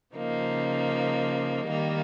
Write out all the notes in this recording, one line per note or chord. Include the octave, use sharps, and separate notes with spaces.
C#3 F3 A#3 D#4
D#3 G3 A#3